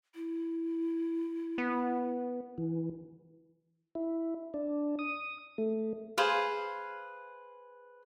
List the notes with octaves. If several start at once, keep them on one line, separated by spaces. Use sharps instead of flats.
E4
B3
E3
E4
D4
D#6
A3
G#4 B4 C5 F5